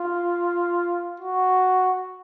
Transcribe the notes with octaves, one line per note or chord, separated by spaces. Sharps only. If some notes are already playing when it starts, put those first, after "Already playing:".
Already playing: F4
F#4